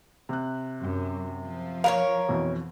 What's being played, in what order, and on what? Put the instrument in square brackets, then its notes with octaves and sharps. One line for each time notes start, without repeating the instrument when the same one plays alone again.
[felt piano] C3 F#6
[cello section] F#2
F3
[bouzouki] A#4 B4 C#5 [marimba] F5
[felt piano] F2 B2 E3